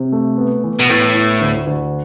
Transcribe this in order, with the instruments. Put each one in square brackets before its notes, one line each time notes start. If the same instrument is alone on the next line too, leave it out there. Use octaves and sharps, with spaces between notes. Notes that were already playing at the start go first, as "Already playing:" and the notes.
Already playing: [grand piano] C3
A3
B3
E3
[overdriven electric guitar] B2
[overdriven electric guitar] A2 [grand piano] B3
[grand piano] E4
D2
D2